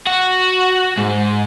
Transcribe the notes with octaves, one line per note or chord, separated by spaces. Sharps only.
F#4
G#2